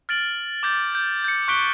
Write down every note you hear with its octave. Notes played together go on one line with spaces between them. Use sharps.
F6 A6 D7 F#7
D6 G6 A6
G6
G6 C#7
C#6 F#6 B6 D7 G7